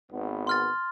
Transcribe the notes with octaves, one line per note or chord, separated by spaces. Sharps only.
G#1 B3
C6 F6 A6